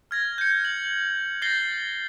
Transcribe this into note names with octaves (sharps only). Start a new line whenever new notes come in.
F6 G#6 A#6
G6 C#7
F#7
G6 A6 A#6 C7 G7